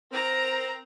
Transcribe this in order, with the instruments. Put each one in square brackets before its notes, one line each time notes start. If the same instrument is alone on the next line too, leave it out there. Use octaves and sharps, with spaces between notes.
[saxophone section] C4 [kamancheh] A#4 A#5